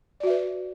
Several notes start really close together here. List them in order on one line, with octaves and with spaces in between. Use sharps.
D5 F#4 E5 B4